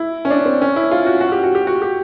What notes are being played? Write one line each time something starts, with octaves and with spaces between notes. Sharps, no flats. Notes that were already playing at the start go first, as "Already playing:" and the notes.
Already playing: E4
C#4
D4
C4
C#4
E4
F4
F#4
F#4
G4
F#4
G4
F#4
G4